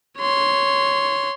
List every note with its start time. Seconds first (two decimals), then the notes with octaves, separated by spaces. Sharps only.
0.19 C#5 C6